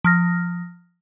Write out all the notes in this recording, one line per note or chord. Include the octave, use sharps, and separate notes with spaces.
F3 F6 A#6